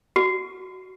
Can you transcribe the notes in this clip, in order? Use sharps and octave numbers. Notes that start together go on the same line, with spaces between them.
F#4